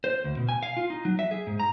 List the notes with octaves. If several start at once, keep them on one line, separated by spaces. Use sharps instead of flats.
C5
D2
B2
G#5
F5
F4
D#4
F#3
E5
G#4
G#2
A#5